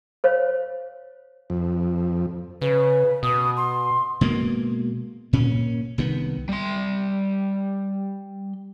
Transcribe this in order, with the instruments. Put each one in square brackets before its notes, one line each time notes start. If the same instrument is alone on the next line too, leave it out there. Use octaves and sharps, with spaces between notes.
[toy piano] C5 C#5 F5
[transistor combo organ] F2
[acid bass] C#3 [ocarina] B4
[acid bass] B2 [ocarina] D#6
[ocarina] C6
[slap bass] B2 G#3 A#3
A#2 C#4
C2 D#3 B3
[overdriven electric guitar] G3 C6